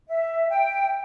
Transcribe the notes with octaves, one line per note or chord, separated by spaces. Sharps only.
E5
G5